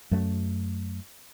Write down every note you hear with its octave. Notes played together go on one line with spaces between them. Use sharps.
F#2 F#3 A3